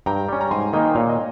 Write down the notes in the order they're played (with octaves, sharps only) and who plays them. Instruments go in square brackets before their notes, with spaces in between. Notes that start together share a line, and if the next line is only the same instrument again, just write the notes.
[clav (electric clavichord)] G2 [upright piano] G5 A#5
[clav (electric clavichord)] G3 C#4
[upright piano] A#5
[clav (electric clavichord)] G#2 [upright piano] G#5 C6
[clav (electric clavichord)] D#3 A#3 D#4 [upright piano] D#5 G5
[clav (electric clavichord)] A#2 [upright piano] C#5 F5
[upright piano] D#5